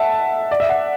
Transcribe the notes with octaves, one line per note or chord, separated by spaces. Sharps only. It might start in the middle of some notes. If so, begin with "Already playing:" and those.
Already playing: E5 F#5 A5
D5
E5
F#5